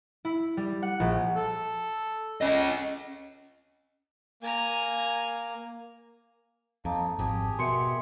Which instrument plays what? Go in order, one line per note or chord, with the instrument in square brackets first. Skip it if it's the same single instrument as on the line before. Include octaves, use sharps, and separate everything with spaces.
[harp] E4
G3
F#5
A#1
[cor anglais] A4
[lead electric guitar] C#4 D#5
[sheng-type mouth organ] A#3 [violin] G#5 A#5
[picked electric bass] F2 [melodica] A#3 D#4 [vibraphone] A5
[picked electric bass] G#1 F2 [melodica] G4 G#4
[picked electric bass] B2 [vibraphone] A#4 E5 F#5 [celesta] C6 C#7